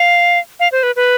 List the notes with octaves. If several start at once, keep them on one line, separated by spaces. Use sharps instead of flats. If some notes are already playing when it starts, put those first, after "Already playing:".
Already playing: F5
F5
C5
B4
B4